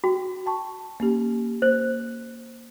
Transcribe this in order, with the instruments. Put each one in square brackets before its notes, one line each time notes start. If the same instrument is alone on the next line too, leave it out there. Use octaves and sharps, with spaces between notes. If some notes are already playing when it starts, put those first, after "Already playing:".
[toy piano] F#4 [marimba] G5
[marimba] G5 A5 C#6
A#3 C#4 G4
[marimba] A#3 [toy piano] C5